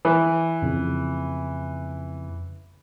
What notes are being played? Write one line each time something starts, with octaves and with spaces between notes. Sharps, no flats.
E3
F2 C#3